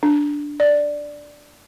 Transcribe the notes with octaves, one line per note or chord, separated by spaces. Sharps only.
D4
D5